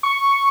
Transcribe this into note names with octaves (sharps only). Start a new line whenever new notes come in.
C#6